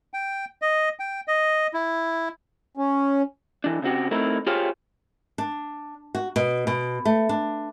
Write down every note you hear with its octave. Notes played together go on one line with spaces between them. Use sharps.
G5
D#5
G5
D#5
E4
C#4
E3 D4
C#3 C4 F#4 G4
A3 C4 D#4 E4 A#4
F4 G4 G#4 C5 C#5 F5
D4
F#4
B2
B2
A3
D4